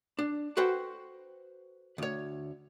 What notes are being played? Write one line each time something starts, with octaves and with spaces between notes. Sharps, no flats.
D4
F#4 A4 B4 C5 F#5 G5
D2 C#5